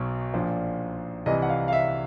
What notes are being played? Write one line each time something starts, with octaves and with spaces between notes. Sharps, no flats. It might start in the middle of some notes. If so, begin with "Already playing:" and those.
Already playing: B1 B2 F#3
A#1 A#2 F3
C2 C3 E3 D#5
F#5
F5
F5
E5